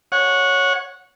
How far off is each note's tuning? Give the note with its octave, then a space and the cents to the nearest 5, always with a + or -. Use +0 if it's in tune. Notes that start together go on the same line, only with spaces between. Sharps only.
C#5 +0 F#5 -20